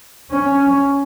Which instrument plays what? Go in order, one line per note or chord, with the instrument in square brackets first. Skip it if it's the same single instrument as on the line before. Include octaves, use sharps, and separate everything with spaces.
[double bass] C#4